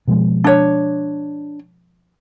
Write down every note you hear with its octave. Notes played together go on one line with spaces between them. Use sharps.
B2 F3 G#3
D4 C#5